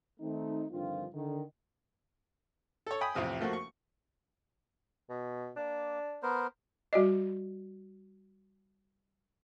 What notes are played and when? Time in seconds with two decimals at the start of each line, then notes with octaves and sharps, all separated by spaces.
0.20 D#3 A3 C4 D#4
0.72 G2 D3 D#3 F3 C4 F4
1.14 D3 D#3
2.87 A4 C#5
3.01 G5 G#5 B5 D#6
3.14 A1 F2 C3 C4 D#6
3.40 F3 A3 A#3 F#4
3.53 C#6
5.10 B2
5.57 A#3 D4
6.23 B3 A#4 C5
6.93 G3 F#4 D5 D#5